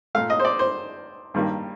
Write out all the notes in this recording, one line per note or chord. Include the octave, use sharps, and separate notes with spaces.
A#2 A3 F5
D#5
C5
D5
C5
G2 D#3 G3 A#3